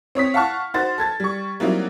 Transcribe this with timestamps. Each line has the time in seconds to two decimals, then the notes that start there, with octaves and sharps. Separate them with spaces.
0.15 C4 C#5 D#6 B6
0.34 F5 F#5 A5 C#6 F6
0.74 D#4 F#4 C5 A6
0.98 A4 G#6 A6
1.20 G3 C#6
1.60 F#3 G3 A#3 C4 D#4 E4